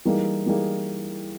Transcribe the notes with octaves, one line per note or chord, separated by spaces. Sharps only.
E3 G3 A#3 D#4 G#4
E3 G3 A#3 D#4 G#4